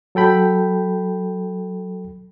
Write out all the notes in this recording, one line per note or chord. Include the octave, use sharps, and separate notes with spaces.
F#3 A4 G5 B5